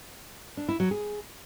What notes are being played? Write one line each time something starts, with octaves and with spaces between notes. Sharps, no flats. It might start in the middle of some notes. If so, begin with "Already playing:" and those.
D4
E4
F#3
G#4